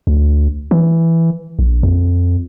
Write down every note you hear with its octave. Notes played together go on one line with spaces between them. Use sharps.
D2
E3
A#1
F2